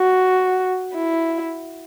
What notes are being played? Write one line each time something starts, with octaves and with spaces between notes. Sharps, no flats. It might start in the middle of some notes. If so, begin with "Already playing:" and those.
Already playing: F#4
E4